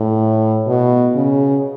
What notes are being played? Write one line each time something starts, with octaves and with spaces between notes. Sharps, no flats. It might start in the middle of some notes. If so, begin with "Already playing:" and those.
Already playing: A2
B2
C#3